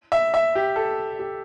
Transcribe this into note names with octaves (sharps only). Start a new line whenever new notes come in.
E5
E5
G4
A4
G4